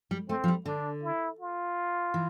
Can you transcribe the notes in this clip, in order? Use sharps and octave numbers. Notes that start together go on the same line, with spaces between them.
G3
A3 C4
F3
G3
D3 D4
E4
F4
E3